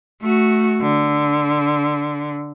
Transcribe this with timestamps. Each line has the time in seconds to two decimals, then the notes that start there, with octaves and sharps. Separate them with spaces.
0.22 A3 F#4
0.82 D3